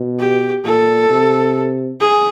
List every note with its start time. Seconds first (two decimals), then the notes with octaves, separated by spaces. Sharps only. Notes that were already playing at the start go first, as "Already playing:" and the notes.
Already playing: B2
0.20 G4
0.65 A#2 A4
1.10 C3
2.01 G#4